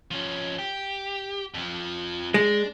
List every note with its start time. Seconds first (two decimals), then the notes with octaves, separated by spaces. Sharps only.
0.11 F3 C#4
0.59 G4
1.54 F2 F3
2.34 G#3 D4